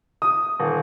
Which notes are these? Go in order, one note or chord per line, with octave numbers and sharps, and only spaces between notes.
D#6
D#1